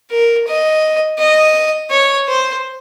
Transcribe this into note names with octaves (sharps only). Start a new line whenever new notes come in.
A#4
D#5
D#5
C#5
C5